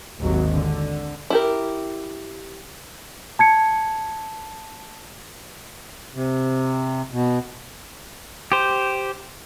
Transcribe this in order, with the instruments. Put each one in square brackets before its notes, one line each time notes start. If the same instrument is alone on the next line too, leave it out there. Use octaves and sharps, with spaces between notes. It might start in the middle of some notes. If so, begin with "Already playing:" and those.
[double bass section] G#1 D#2 G#2 F#3
D3
[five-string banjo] E4 G4 A#4
[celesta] A5 G#6 C#7
[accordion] C3
B2
[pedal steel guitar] G4 C5